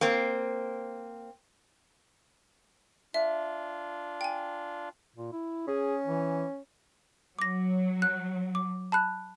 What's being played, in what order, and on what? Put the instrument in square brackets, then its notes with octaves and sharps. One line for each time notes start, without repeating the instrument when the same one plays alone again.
[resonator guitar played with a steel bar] A#3 C4
[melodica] D4 F4 [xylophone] E5
[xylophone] G5 G#5
[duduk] A#2
E4
[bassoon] C#4 [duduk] G#4
[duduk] E3
[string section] F#3 [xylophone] D6 A#6
[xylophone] F#6
D6
A5 B5 F#6